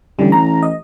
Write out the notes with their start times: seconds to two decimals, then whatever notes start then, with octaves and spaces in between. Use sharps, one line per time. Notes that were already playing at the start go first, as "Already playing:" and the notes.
0.19 A1 D3 G3
0.32 A#5
0.63 D#5